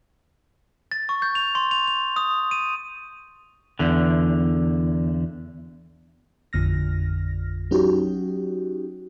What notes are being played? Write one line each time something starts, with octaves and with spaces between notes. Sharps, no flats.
A6
C#6
G6
F7
C6
F7
F7
D#6
D#7
E2 D3
A1 F2 D3 F6 A#6
F#3 C#4 D#4 F#4 G4